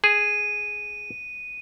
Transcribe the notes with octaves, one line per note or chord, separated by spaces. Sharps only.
G#4 D#7